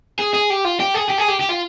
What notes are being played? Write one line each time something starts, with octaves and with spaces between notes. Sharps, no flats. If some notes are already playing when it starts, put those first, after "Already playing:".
G#4
G#4
G4
F4
G4
G#4
G4
G#4
G4
G4
F4